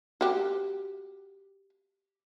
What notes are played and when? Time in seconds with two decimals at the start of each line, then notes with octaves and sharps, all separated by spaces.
0.21 F#4 G4